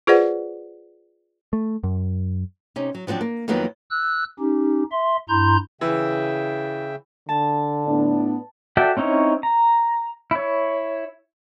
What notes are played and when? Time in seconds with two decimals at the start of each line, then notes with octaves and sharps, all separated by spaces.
0.07 F4 G#4 B4 C5 D5 F#5
1.53 A3
1.84 F#2
2.76 C3 C#4 D#4
2.95 F#3
3.07 F3 F#3 B3 C4 D4
3.21 A#3
3.48 F2 D#3 F#3 A#3 B3 D#4
3.91 E6 F#6
4.39 C#4 D#4 G4
4.92 E5 C6
5.29 G2 E4 A#5 C6 G6
5.81 C#3 E3 E5 G5
7.29 D3 A5
7.86 A2 B3 D4
8.77 F#4 A4 D5 E5 G5
8.97 C4 C#4 D#4 E4 C#5
9.43 A#5
10.31 E4 C#5